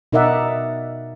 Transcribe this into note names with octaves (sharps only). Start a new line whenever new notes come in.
B2 D#4 A#4 D5 E5 F#5